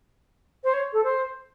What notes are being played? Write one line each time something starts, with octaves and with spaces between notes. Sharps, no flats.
C5
C#5
A4
C5